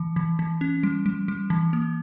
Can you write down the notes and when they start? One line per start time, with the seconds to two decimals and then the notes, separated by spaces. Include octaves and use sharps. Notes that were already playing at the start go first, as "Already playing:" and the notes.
Already playing: E3
0.16 E3
0.39 E3
0.61 C#4
0.83 G3
1.06 G3
1.28 G3
1.50 E3
1.73 A#3